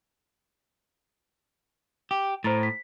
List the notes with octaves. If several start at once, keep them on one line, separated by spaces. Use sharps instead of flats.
G4
A2 C5 A#5 A6
B6